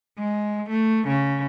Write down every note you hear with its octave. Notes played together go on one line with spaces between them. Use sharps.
G#3
A3
C#3